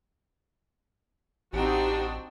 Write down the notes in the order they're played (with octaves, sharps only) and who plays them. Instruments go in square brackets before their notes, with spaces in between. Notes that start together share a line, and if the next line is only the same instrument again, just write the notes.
[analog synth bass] A1 [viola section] C4 D#4 F#4 [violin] D4 G5 [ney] G4